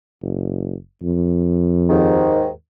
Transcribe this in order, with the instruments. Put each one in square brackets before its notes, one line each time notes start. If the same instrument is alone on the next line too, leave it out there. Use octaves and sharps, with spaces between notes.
[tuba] F#1
F2
[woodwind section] D#2 G#2 D#3